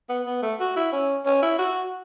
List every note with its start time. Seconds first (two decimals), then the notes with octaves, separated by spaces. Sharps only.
0.09 B3
0.26 B3
0.43 A3
0.60 F#4
0.76 E4
0.92 C#4
1.26 C#4
1.42 E4
1.58 F#4